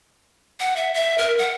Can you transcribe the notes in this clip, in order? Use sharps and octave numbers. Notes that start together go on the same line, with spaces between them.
F#5
E5
E5
A#4
F#5